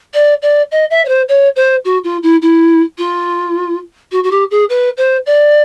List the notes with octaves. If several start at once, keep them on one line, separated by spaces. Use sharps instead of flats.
D5
D5
D#5
E5
C#5
C5
C#5
C5
F#4
F4
E4
E4
F4
F#4
F#4
G4
G#4
B4
C5
D5